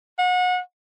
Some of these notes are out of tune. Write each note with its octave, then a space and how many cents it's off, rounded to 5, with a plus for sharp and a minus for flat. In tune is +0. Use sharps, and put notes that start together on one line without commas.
F#5 -30